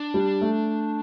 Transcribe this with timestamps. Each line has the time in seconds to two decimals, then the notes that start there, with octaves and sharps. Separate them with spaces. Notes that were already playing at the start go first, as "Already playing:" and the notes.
Already playing: D4
0.14 G3
0.41 A3